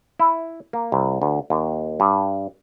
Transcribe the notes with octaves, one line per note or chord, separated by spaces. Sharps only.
E4
A#3
C2
D2
D#2
G2